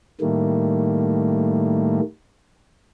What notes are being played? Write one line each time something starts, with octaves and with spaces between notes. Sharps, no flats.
A2 D#3 G3 A3 A#3